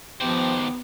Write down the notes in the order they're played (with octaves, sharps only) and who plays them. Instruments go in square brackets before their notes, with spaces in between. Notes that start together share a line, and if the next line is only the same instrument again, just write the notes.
[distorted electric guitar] D#3 C5 [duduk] F3 [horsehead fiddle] B3 [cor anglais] G4